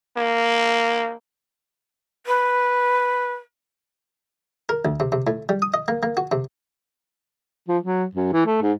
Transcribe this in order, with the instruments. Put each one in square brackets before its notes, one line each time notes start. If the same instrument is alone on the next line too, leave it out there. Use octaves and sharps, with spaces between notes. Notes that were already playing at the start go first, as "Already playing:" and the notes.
[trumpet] A#3
[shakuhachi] B4
[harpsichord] A#4
D2
C3
C3
A2
G3
D#6
D#5
A#3
A#3
F#4
C3
[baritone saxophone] F3
F#3
F#2
E3
A3
G#2